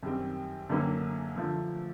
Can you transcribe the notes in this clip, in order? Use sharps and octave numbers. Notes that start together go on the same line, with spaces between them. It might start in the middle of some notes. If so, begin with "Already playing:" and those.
F#2 D#3 G3 C4
F#2 D3 F#3 A#3 C#4
D3 F3 A3